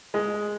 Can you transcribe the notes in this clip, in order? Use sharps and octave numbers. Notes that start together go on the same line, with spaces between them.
G#3